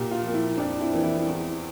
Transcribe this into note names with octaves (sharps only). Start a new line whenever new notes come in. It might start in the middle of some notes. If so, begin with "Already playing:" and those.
Already playing: A#2 G4
F4
F3 A#3
E4
F2 D4
E4
E3 A#3
E4
E2